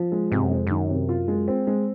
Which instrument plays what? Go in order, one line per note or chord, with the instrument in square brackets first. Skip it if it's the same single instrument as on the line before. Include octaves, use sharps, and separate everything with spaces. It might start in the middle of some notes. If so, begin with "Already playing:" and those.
Already playing: [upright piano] F3
G#3
[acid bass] G#2 [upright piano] C3
[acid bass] F#2
[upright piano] G#3
[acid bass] F2
[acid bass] F#2 [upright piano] D#3
[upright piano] C3
F4
G#3
C4
G#3